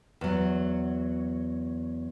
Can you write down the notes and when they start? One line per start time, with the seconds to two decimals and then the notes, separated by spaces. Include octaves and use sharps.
0.21 E2 F#3